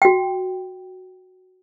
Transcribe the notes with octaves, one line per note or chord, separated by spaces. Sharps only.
F#4 G5